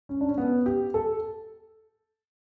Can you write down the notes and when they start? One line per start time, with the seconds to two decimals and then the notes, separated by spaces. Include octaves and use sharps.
0.09 C#4
0.21 D4
0.29 C#4
0.38 B3
0.66 G4
0.94 A4